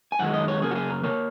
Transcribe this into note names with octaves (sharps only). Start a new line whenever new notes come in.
G#5
F#2 D#3 G#3 F#5
D#5
C#5
F#2 C#3 A#3 G#4
F#4
G#4
A#4
C#3 A#3 C#5